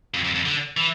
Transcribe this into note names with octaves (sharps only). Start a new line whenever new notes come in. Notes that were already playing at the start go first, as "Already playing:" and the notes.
F2
F2
F2
D3
E3